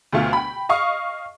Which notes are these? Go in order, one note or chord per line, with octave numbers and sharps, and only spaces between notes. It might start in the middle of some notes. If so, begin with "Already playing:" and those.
D2 B2 A3 F4
G5 B5
D#5 F5 C#6 D#6